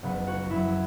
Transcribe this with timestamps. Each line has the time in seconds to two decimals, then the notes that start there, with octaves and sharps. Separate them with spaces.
0.03 F#1 B3
0.27 F#4
0.50 F#2 F#3 E4